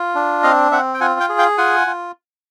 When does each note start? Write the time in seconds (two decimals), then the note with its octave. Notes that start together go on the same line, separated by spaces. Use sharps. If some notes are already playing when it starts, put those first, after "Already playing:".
Already playing: F4
0.15 D4
0.43 C4 D#5 F5
0.71 C4 E5 F#5
0.94 G5
1.01 F4 F#5 G#5
1.20 F5 G5
1.29 G#4
1.38 F5 G5
1.58 F4 F#5 G#5
1.87 F4